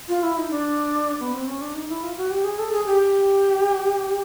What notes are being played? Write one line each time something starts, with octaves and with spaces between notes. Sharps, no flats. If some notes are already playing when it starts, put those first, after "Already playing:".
F4
E4
D#4
D4
B3
C4
C#4
D4
D#4
E4
F4
F#4
G4
G#4
A4
G#4
G4